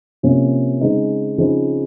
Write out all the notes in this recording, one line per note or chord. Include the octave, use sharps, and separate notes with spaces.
C3 F3 A#3 C#4
C#3 G#3 C4 D#4
C#3 F3 C4 D#4